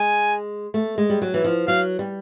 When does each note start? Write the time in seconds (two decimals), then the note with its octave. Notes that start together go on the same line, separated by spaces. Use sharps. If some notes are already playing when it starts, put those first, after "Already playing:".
Already playing: G#3 G#5
0.74 A3
0.98 G#3
1.10 G3
1.22 F#3
1.34 E3
1.44 F3
1.68 F#3 F5
1.99 G3